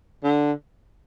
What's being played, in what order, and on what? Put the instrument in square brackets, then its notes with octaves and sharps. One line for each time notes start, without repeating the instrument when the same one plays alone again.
[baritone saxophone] D3